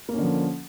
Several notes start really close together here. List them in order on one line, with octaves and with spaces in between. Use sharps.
A#3 C#4 D3 F3